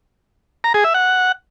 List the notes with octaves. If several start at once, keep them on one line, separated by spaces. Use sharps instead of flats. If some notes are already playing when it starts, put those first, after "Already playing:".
A#5
G#4
E5
F#5